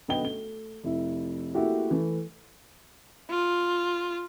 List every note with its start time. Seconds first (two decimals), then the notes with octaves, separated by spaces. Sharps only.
0.08 B1 D3 B3 D#5 G5 G7
0.23 A3 G7
0.84 F1 E4
1.55 A3 A#3 E4 F#4 G4
1.91 E3 A3
3.30 F4